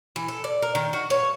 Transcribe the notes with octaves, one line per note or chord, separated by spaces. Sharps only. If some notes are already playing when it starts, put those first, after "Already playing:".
E3
A4
D5
A#4
D#3
F#4
C#5